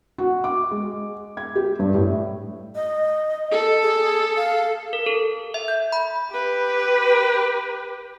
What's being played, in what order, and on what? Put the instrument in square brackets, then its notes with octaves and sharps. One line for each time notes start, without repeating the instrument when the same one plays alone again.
[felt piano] F#4
D6
G#3
G#6
G4
G2
A2
[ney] D#5
[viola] A4
[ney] G#4
F5
[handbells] A#4
A4
E5
G6
B5
[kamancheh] G4 B4